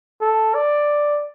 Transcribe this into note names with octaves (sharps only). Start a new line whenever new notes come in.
A4
D5